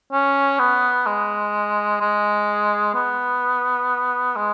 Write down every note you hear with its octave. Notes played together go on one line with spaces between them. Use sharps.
C#4
B3
G#3
G#3
B3
G#3